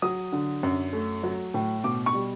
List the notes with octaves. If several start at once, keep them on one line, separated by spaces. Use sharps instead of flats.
F#3 D#6
D3
F#2
A3
F#3
A2
B2 D6
C#6
G3